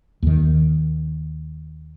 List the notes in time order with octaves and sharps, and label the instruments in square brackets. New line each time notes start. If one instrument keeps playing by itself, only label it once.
[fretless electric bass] D#2 D#3